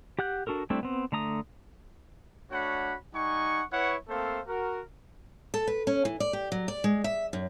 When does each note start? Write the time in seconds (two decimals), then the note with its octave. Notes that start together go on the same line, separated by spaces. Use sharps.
0.19 G4 F#5 F#6 G6
0.47 D4 F#4 A4 A#4
0.70 G3 A3 C4 D4 E4
0.83 B3 C4
1.12 D3 A3 A#5 D#6
2.52 A3 D4 F#4 C#5 F#5 B5
3.14 G3 D#4 F#5 G#5 C#6
3.73 E4 B4 C#5 F#5 C#6
4.09 A3 A#3 C4 A4 C5 F5
4.47 F#4 A#4
5.54 A4
5.67 B4
5.87 C#4
6.05 E3
6.20 D5
6.33 G4
6.52 F#3
6.68 D5
6.84 G#3
7.04 E5
7.33 F#2